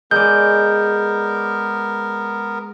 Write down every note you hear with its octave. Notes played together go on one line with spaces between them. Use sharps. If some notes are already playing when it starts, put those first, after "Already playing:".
G#3 B3 A#4 D5 G6